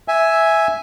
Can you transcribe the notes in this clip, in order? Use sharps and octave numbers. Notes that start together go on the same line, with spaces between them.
E5 G#5